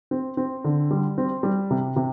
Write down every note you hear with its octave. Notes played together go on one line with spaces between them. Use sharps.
C4
C4
D3
G3
C4
G3
C3
C3